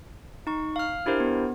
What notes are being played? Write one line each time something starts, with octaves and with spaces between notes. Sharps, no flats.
D#4 C#6
F5 F6
D4 E4 G4 A#4 C5
B3